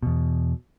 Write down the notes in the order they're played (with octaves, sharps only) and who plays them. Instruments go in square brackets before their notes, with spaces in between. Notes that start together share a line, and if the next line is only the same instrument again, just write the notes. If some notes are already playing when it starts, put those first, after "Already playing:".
[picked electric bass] E2 B2